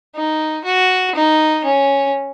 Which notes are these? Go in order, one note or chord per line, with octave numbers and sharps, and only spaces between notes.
D#4
F#4
D#4
C#4